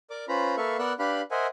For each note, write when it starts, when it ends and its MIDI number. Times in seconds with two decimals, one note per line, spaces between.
0.10 0.25 70
0.10 0.25 74
0.10 0.25 86
0.28 0.56 61
0.28 0.56 65
0.28 0.56 71
0.28 0.56 72
0.28 0.56 82
0.28 0.56 83
0.57 0.77 58
0.57 0.77 69
0.57 0.77 71
0.57 0.77 76
0.57 0.77 77
0.57 0.77 85
0.79 0.93 59
0.79 0.93 70
0.79 0.93 74
0.79 0.93 78
0.79 0.93 88
0.79 0.93 90
0.99 1.22 62
0.99 1.22 67
0.99 1.22 71
0.99 1.22 77
0.99 1.22 83
0.99 1.22 90
1.31 1.47 70
1.31 1.47 72
1.31 1.47 75
1.31 1.47 76
1.31 1.47 78
1.31 1.47 80